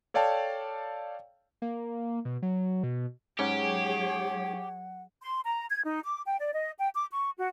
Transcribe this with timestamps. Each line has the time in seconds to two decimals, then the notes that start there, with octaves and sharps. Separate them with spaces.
0.14 A4 C#5 D5 F5 G5 A5
1.62 A#3
2.25 B2
2.42 F#3
2.83 B2
3.39 G#2 F#3 C#4 G4 G#4 C#5 F#5
5.22 C6
5.44 A#5
5.70 G#6
5.85 D#4
6.03 D6
6.25 G5
6.39 D5
6.53 D#5
6.79 G5
6.94 D6
7.12 C#6
7.38 F#4